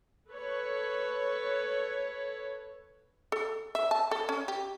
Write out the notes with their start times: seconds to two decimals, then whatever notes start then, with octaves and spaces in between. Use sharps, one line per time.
0.30 A4 B4 C#5
3.32 A4
3.75 E5
3.91 A5
4.11 A4
4.29 C#4
4.48 G4